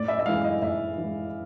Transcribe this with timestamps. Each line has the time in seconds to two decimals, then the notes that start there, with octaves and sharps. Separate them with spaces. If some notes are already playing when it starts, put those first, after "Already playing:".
Already playing: A2 D5
0.08 E5
0.20 E5
0.26 E3 G#3 F5
0.44 D#5
0.62 A2 E5
0.98 E3 G#3